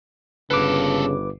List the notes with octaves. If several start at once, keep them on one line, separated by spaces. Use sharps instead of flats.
G1 C#3 A#3 A4 B4 D6